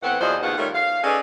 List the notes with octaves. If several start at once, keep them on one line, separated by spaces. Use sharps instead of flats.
A2 E3 B3 C4 F#5
E2 F3 F#3 C5 D5 D#5
D#2 C#3 B3 F4 F#5
D#3 G3 A3 F4 A#4 C#5
F5
C#4 D#4 G#4 A4 B4 D5